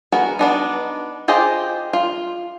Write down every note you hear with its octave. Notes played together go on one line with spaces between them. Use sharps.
B3 F#4 G#4 A#4 B4
B3 D4 D#4
F4 G4 G#4 C5 D#5
F4